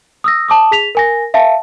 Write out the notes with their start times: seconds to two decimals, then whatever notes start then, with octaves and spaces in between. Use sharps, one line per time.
0.24 D#6 E6 A#6
0.48 A5 D6 D#6
0.71 G#4 B6 F7
0.95 A#4 G#5 A#6
1.34 E5 F5 A5